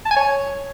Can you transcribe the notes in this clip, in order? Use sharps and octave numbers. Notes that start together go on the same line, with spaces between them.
A5
G#5
C#5